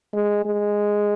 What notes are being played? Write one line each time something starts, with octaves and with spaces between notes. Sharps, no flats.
G#3
G#3